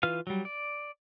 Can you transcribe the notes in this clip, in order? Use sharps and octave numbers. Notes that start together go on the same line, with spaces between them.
E3 F4 B4 F5 F6
F#3 G3
D5